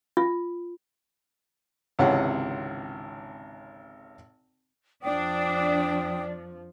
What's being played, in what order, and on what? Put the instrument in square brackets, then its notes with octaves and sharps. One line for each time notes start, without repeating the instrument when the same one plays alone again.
[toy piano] F4
[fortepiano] G#1 C#2 C3 E3 C#5 F#5
[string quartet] F2 F3 [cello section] D4 [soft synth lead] D5 [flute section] G5 D#6